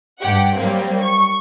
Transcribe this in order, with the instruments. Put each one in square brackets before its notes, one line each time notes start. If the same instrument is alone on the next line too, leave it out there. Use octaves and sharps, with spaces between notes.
[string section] G2 G4 F#5
F#3 G3 A#3 C4
C#6